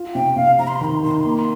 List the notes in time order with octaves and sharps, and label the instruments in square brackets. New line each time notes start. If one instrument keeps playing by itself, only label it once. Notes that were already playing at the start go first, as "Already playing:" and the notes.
Already playing: [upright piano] F4
[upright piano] C3 [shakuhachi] G5
[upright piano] C3 [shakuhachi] F5
[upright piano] C3 [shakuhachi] A#5
[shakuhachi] C6
A#5
[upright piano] D#3 [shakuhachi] C6
[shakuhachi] A#5
[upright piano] D#3 [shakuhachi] C6
[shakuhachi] A#5
C6
[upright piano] A#3 [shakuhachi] A#5
[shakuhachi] C6